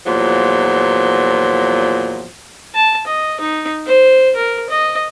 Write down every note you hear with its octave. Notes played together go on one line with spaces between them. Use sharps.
E2 A#2 F3 F#3
A5
D#5
D#4
C5
A#4
D#5